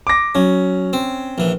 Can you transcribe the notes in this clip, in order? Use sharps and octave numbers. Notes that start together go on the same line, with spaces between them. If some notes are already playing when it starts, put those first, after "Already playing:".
D6 A#6
F#3 C#4
C4
A#1 E3